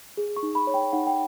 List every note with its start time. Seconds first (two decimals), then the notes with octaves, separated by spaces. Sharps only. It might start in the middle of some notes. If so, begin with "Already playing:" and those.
0.17 G#4
0.36 C#6
0.43 D#4
0.55 B5
0.67 C#5
0.74 G5
0.93 D#4 F#5
1.07 G5